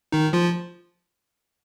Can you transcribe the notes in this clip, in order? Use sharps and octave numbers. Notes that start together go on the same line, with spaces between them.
D#3 D#4
F3 F4